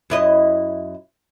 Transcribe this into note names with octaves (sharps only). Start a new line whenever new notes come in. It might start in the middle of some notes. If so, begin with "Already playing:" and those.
F#2 E4 D#5